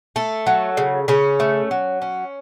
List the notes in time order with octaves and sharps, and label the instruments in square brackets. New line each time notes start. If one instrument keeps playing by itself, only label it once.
[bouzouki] A3 A4
F#3
C#3
C#3 C#4
A3
F#3
C#4